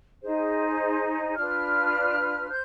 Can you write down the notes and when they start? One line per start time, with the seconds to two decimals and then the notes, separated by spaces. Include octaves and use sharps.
0.22 D#4 G#4 C5
1.35 D4 F4 B4 F6
2.49 C5 G6